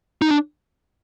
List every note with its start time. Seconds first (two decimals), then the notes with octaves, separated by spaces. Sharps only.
0.22 D#4
0.30 D4